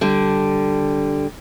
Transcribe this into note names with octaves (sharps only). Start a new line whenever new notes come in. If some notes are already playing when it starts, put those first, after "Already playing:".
D3 G3